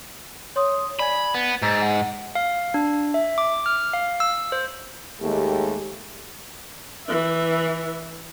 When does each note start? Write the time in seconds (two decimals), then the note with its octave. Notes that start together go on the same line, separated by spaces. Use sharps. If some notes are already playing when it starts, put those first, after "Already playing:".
0.56 C#5 C6 D#6
0.99 D5 G#5 B5 G#6
1.34 B3
1.62 G#2 A#5 E6 A6
1.82 F#5
2.35 F5
2.74 D4
3.14 E5
3.38 D6
3.66 F6
3.93 F5
4.20 E6
4.52 C5
5.22 D#2 G#3 A3 G4
7.06 E3 E5